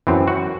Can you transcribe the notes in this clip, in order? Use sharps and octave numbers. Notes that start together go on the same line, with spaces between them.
F#2 E3 C4
F#4